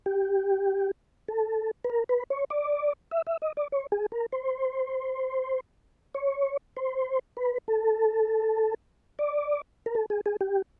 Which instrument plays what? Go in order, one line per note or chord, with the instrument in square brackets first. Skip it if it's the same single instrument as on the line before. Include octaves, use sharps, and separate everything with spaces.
[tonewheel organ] G4
A4
B4
A#4
B4
C#5
D5
E5
E5
D#5
D5
C#5
G#4
A#4
C5
C#5
C5
B4
A4
D5
A#4
A4
G#4
G#4
G4